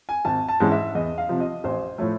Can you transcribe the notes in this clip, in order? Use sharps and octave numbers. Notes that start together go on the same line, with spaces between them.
G#5
G#1 A5
A5
G#2 E3 G#3 C#4
E5
E2 D#5
F5
C3 F3
D#5
A1 C5
A2 F3 A3 C#5